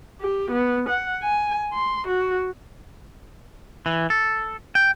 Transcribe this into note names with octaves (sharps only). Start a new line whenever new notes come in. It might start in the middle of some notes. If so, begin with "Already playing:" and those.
G4
B3
F#5
G#5
C6
F#4
E3
A4
G5